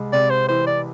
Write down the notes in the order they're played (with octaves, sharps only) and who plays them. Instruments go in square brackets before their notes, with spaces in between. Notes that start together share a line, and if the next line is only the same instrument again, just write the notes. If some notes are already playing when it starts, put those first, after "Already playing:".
Already playing: [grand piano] C2 G#3
[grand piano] C3 [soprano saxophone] D5
[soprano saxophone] C5
[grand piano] E3 [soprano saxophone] C5
[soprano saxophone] D5